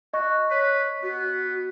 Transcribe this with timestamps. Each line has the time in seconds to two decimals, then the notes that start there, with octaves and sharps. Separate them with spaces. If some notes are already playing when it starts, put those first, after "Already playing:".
0.14 F#4 D#5 C#6
0.50 B4 C#5
1.03 B3 F#4